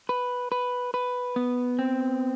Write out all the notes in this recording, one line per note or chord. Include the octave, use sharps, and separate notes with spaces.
B4
B4
B4
B3
C4